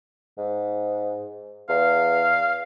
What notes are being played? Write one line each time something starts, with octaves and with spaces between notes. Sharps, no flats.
G#2
E2 F5